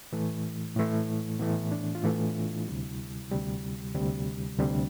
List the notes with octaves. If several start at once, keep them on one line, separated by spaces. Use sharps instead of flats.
A2 E3 A3
A2 E3 A3
A2 E3 A3 B3
D4
F4
A2 E3 A3 E4
D2 C3 G3
D2 C3 G3
D2 C3 G3
D2 C3 G3 D4